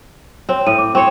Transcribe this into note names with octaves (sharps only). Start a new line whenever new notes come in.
C4 C#5
A2 D#7
D6
C4 C#5 G5 C#6